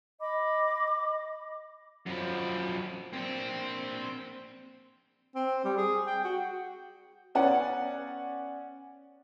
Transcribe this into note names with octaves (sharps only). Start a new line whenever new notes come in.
D#5 B5 D6
F#2 F3 F#3 B5
A#3 C4 D4
C4
G3
G#4
G5
F#4
B3 C#4 D5 F#5